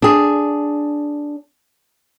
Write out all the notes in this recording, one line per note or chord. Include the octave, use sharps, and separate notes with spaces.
D4 G#4